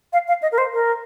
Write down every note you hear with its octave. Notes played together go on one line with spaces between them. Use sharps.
F5
F5
D#5
A#4
C5
A#4